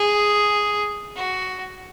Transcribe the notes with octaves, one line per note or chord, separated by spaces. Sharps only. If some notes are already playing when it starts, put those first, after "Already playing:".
Already playing: G#4
F#4